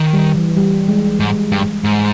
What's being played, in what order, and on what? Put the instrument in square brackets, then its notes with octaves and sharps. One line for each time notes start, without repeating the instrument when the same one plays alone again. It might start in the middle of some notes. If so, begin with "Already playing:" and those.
Already playing: [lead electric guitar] D#3
[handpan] G3
E3
G3
G#3
[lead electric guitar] G#2 [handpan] G#3
[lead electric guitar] G2
G#2